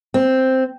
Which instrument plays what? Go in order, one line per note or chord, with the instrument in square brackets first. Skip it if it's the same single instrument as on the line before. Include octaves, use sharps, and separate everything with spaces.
[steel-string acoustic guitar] C4